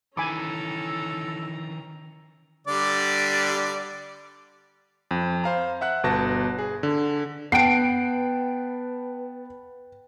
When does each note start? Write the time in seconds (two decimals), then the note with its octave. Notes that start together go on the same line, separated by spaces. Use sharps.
0.17 D#3 E3 C#4 A4 G#5 A#5 B5 D6
2.67 D3 G3 D5
5.11 F2
5.44 C5 F5 A#5
5.81 E5 F#5 F#6
6.04 G1 B2 A5 A#6
6.58 G#4
6.83 D3
7.52 B3 B4 F#5 G5 A5 C7 D7